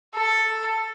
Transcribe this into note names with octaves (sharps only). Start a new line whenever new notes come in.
A4